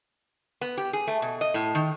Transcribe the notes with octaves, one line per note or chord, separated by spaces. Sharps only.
B3
G4
G#4
A3
B2
D#5
A2
D#3